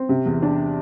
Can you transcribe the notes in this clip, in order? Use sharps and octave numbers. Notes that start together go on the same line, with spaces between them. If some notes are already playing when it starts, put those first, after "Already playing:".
Already playing: C4
C3
E2
D4